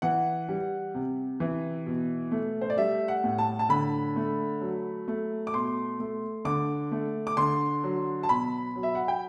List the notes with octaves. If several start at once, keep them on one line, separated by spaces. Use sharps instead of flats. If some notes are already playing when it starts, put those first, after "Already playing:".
E3 F#5
G3
C3
E3
B2
A3
C5
D5
G3 E5
F#5
A2
A5
A5
D3 B5
A3
F#3
A3
D6
B2 C6
A3
D3 D6
A3
D6
D3 C6
F#3
A5
B2 B5
F#3
E5
F#5
G5